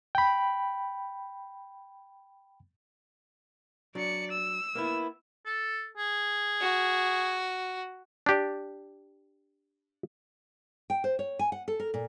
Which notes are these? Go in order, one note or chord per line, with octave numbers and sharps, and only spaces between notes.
G5 B5
F#3 D4 D5 C#7
E6
A#3 B3 E4
A4
G#4
F#4
D4 G4 D5
G5
C5
C#5
G#5
F#5
A4
A#4
A#2